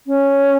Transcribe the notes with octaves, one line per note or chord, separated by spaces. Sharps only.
C#4